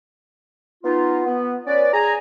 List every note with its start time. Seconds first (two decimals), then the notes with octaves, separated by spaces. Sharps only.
0.84 B3 D#4 F4
1.25 B3
1.66 C#4 B4 D5
1.93 G#4 G#5 A#5